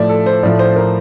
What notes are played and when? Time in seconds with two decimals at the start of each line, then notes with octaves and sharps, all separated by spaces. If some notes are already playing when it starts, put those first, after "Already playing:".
Already playing: A2 F3 A3 D5 E5
0.09 A4
0.26 C5
0.43 A2 F3 A3 D5
0.59 C5
0.76 A#4